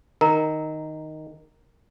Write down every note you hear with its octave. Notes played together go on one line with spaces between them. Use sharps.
D#3 A#4 A#5